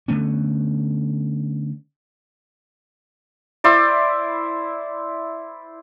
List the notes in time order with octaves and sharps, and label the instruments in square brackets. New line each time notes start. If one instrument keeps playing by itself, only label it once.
[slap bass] D3 A3 B3 C#4
[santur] E4 C5 D5